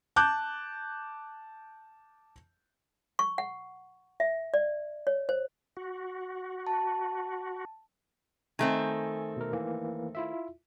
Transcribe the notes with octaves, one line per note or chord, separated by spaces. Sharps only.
A5 D6 F#6 G6
C#6
F#5
E5
D5
C#5
C5
F#4
A5
D#3 A3 C4 G#5
B2 A#4
E3 A#3
E4 F4 E5